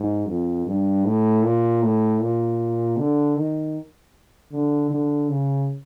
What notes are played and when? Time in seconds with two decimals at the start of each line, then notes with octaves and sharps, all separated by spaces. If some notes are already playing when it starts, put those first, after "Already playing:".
Already playing: G#2
0.28 F2
0.66 G2
1.05 A2
1.43 A#2
1.83 A2
2.21 A#2
2.97 D3
3.36 D#3
4.52 D3
4.90 D3
5.29 C#3